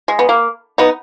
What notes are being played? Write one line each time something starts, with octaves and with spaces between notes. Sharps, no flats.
G#3
B3
A#3
B3 D#4